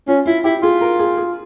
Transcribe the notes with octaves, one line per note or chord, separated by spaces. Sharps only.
C#4 F4
E4 F4
E4 G4
F4 G#4
A#4
G#4
G#4